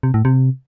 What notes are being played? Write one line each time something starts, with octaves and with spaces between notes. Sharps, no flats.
C3
A2
C3